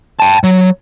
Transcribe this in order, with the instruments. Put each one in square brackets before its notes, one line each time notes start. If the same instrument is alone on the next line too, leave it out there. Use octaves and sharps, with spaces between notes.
[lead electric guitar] G5 A5
F#3